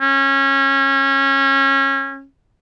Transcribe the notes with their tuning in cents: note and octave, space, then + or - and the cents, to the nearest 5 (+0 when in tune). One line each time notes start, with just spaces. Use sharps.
C#4 -25